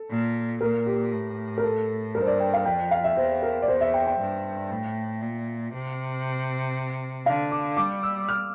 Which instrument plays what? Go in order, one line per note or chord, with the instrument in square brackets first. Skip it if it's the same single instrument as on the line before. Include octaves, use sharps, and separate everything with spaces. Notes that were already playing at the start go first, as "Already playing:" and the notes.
Already playing: [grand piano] A4
[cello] A#2
[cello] A#2 [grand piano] A#4
[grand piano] G4
[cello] A2
[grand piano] A#4
A4
[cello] G2 [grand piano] A#4
[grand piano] C5
D5
G5
F5
[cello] F2 [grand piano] G5
[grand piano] F5
E5
[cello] E2 [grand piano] C5
[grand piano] A#4
D5
[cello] E2 [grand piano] C5
[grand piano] E5
G5
G5
[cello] G2
A2
A#2
C3
[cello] D3 [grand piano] F5
[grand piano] D6
[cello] G3 [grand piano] D6
[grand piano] E6
F6